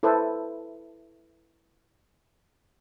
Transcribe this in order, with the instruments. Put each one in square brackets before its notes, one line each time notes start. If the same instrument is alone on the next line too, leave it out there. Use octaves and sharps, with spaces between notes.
[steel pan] E4 A4 B4 C5